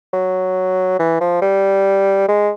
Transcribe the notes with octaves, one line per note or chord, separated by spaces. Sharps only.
F#3
E3
F3
G3
G#3